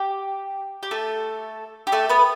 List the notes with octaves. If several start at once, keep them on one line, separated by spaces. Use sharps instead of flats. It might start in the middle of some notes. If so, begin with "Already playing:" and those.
Already playing: G4
G4
A3 A4
G4
A3 A4
B3 B4